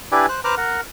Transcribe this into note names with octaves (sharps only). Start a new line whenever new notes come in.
D4 E4 G4 B4 D5 G#5
C5 F#6
B4 C5 A#5 D6 F6 F#6
A#4 F#5